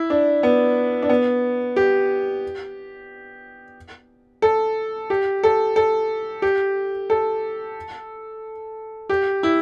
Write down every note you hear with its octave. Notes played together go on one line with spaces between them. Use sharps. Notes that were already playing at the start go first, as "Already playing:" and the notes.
Already playing: E4
D4
B3
D4
B3
G4
A4
G4
A4
A4
G4
A4
G4
E4